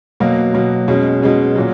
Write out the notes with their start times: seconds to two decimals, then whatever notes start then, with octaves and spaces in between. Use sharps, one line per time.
0.20 B2 F#3 A#3
0.54 B2 F#3 A#3
0.88 B2 G#3 C#4
1.22 B2 G#3 C#4
1.55 A#2 F#3